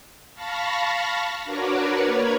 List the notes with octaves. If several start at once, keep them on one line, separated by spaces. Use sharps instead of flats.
F5 A5 B5 C#6 A#6
D4 F#4 A#4 B4 C#5 D5
A#3 B4 C#5 A#5 G#6